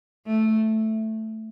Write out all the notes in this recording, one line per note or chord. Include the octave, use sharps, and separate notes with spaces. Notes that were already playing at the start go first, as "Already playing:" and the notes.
A3